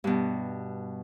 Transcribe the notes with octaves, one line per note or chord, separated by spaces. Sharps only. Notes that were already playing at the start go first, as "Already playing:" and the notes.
G2 B2